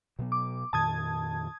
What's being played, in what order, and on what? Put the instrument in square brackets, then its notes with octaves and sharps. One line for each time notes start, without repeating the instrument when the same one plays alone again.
[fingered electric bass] B2 F#3 B3
[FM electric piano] D6
[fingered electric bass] F2 A#2 D#3 [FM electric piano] A5 D#6 G#6